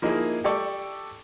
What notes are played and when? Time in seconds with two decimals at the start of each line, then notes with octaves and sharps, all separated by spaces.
0.02 F3 A#3 D#4 E4 G#4
0.44 G4 A4 D5 C#6